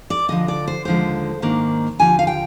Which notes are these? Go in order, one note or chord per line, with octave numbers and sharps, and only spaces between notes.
D5
D2 D3 F3 D#5
D5
C5
D#2 D3 F3 G#3 C5
G#2 D#3 A#3 D4
D#2 D3 F3 G#5
F5
G5